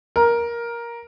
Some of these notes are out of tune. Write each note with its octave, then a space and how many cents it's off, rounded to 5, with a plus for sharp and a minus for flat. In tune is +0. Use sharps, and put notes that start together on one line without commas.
A#4 +10